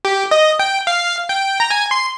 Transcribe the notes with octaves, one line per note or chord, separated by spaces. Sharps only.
G4
D#5
G5
F5
G5
A#5
G#5
C6